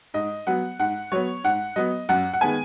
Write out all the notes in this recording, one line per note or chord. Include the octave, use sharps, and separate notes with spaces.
G#2 D#5
F#3 B3 F#5
G#2 F#5
F#3 B3 C#5
G#2 F#5
F#3 B3 D#5
F#2 F#5
F#5
D#3 G#3 B3 G#5